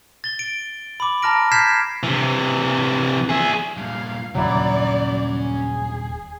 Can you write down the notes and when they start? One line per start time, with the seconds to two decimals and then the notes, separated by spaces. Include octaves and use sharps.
0.24 A6 G7
0.39 D7
1.00 B5 D6
1.22 A5 A#5 F6 A#6 D7
1.52 F6 G6 G#6 B6 C7 E7
2.03 C3 E3
3.29 G#4 E5
3.77 G2 A#2 F5
4.35 D#1 G2 C#3 F#3 C#4 E4 D5 A#5
5.44 G#4